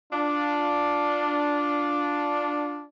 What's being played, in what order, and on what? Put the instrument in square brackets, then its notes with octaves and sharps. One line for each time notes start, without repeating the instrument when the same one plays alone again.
[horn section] D4 F4